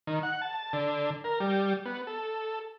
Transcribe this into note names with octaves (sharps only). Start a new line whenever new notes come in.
D#3
F#5
A5
D3
A#4
G3
B3
A4